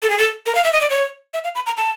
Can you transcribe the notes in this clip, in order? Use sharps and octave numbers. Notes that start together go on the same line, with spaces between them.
A4
G#4
A4
A#4
F5
E5
D#5
D5
C#5
E5
F5
B5
A#5
A5